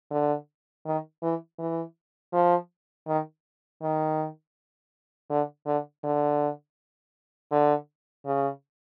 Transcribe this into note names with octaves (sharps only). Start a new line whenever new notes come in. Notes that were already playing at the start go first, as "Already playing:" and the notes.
D3
D#3
E3
E3
F3
D#3
D#3
D3
D3
D3
D3
C#3